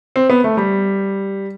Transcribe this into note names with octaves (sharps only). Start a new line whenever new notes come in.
C4
B3
A3
G3